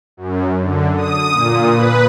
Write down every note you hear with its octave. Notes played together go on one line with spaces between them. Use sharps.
F#2
D3
D#6
A#2
B4